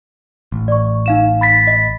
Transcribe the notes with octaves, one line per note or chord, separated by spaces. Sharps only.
A1
D5 C#6
D#4 F5 E7
B5 A6 B6
D#5